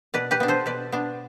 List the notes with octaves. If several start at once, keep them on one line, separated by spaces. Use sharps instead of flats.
B2 B4 D5
G4 B4
B3 D4
A4 C5
B2 B4 D5
B3 D4